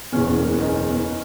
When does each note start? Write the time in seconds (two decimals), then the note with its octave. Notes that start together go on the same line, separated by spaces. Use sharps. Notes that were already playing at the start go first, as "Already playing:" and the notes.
0.13 F#1 E2 B2 C#4
0.27 B3
0.39 A#3
0.52 B3
0.59 D#4
0.65 C#4
0.90 B3